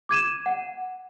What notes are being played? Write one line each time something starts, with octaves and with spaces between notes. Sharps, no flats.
D6 G#6 D#7 E7
F#5